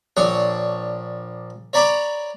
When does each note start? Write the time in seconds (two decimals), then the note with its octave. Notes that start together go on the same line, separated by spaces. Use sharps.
0.17 A#1 D4 C#5 C#6 D#6
1.73 C#5 D5 A#5 B5 D6